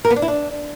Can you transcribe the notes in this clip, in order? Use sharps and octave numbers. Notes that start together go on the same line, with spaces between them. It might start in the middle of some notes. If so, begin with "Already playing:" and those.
A#4
B3
D4
E4
D4